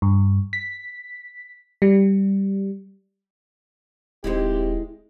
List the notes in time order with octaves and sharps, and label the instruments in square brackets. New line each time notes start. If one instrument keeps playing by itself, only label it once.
[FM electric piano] G2
B6
G3
[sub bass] D#1 [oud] G#3 D#4 E4 [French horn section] C4 G4